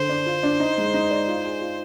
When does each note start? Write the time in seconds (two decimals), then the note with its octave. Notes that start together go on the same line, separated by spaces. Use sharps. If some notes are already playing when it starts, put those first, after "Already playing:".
Already playing: D3 C5
0.09 D4
0.26 F4
0.43 D4
0.60 D#4
0.78 G#3
0.94 D#4
1.11 D5
1.28 F4
1.44 G#4
1.61 F4